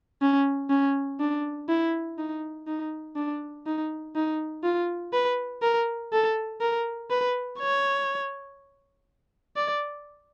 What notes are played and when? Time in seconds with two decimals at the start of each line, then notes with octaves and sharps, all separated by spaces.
0.22 C#4
0.70 C#4
1.20 D4
1.69 E4
2.18 D#4
2.67 D#4
3.16 D4
3.66 D#4
4.16 D#4
4.64 F4
5.13 B4
5.62 A#4
6.13 A4
6.61 A#4
7.10 B4
7.59 C#5
9.57 D5